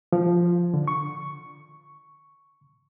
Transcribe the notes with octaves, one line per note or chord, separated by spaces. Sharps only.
F3
D3
C#6